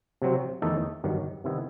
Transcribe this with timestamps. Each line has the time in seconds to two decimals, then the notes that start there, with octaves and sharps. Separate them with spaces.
0.22 C3 F#3 C4
0.62 E2 D#3 A3 D#4 A4
1.04 G1 G2 D#3 F#3
1.44 C3 D#3 G3 B3 E4